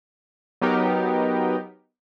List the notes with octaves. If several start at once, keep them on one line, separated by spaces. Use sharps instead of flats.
F#3 B3 D#4 G4 A#4